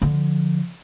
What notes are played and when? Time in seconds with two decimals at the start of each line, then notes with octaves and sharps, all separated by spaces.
0.02 D3 F3